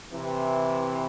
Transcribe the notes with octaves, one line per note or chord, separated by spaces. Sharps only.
C3 E3